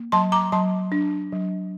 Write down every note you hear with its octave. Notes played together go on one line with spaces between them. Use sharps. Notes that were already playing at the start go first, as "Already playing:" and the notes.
Already playing: A#3
F#3 A5 C6
A#5 D6
F#3 A5 C6
D4
F#3